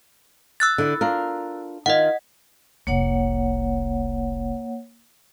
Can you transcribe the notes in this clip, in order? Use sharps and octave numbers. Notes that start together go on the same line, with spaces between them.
E6 F#6 A6
D3 E4
D4 F4 A#4
D#3 F4 D#5 F#5
F1 C2 A#3 C#5 F#5